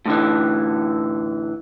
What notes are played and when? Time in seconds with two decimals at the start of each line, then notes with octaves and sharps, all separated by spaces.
0.06 A2 D3 E3